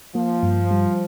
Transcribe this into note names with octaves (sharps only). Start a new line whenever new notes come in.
F3 A#3
G2
G3